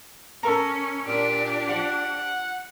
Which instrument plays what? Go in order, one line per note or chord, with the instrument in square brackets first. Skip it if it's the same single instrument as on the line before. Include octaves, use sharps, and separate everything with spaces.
[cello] C#4 [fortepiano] A4 A#4 A#5
[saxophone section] A#2 [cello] D4 G4
[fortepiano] F3 [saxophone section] F#5